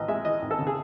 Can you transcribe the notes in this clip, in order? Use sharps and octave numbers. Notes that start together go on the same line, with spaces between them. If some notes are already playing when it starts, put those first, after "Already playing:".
Already playing: A1 C#4 D#5
G#3 E5
E3 D#5
G#1
A4
C#3
G#4